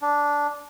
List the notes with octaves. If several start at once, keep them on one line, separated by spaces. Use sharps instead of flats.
D4